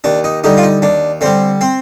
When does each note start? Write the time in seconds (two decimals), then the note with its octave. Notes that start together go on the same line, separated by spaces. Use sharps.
0.04 D#2 D4
0.24 D#4
0.44 D3 G3 D#4
0.57 F4
0.63 D#4
0.82 D#2 D4
1.21 D3 G3 C4
1.61 C4